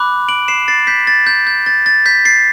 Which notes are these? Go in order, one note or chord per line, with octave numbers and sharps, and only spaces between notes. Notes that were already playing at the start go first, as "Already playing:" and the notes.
Already playing: B5 D6 F#6
D7 F#7
C7 E7
A6 C7
G6 B6
A6
G6
G6
A6
A6
G6 B6
A6 C7